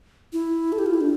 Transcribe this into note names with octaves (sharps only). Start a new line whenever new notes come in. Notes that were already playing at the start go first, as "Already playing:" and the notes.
E4
A4
G4
F4
E4
D4